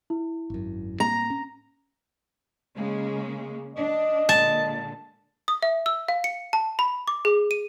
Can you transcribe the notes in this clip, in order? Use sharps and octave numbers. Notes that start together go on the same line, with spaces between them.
E4
G#1 F#2
A2 A#3 C4 A#5 A#6
C#4
C#3 G#3 A#3
D4 D#5
A#2 D3 G#3 A5
D#6
E5
E6
F5
C#7
A5
B5
D6
G#4
D#7